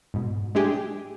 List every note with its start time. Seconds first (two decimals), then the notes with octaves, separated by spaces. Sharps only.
0.14 G#2 B2
0.55 G#3 A3 D4 G4 G#4